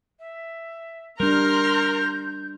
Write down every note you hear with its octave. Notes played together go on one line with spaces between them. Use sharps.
E5
G3 D4 A#4 A#5 C6 F6 G6